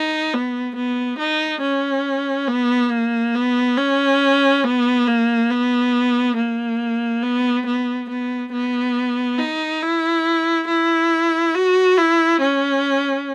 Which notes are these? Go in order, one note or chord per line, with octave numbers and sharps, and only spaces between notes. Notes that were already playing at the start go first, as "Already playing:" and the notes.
Already playing: D#4
B3
B3
D#4
C#4
B3
A#3
B3
C#4
B3
A#3
B3
A#3
B3
B3
B3
B3
D#4
E4
E4
F#4
E4
C#4